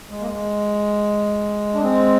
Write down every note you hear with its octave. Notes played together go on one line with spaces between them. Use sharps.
G#3
A#3
G#3
D4
G#3 C4